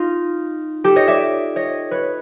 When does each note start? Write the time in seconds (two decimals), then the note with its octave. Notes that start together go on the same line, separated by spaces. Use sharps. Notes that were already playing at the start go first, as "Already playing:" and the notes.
Already playing: D#4 F4
0.84 G4 A4
0.96 C#5 D#5
1.08 D5 E5
1.56 C#5 D#5
1.91 B4 C#5